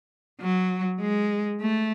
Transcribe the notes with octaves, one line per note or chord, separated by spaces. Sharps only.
F#3
G#3
A3